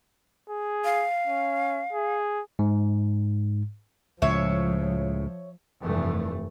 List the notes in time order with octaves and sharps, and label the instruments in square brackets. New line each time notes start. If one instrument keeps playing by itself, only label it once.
[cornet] G#4
[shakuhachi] F5
[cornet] C#4
G#4
[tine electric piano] G#2
[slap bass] C#2 A2 [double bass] F3 [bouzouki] C#5 E5
[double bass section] F1 G2 E3 A3